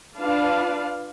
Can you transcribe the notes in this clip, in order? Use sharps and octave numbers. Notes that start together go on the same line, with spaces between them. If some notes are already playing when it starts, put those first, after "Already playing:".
D4 F4 B4 D5 F5 A5